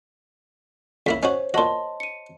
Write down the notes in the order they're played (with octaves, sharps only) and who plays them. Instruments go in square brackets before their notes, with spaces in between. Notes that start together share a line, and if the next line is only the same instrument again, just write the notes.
[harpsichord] C#2 A#3 E4 [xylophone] B6
[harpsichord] C#4 D#4 F#4 [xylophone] C5 C#5
[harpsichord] A#2 F#4 [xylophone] D#5 A5 C6
[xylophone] C#7 D#7